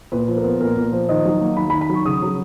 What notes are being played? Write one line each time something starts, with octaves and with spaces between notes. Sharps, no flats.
A#2 B4
F3
A#4
B3
A#2 A#4
A#2
F3
D#3 D#5
F#3
A#3
D#3 B5
B5
D#3
B5
F#3 C#6
C#3 D#6
F#3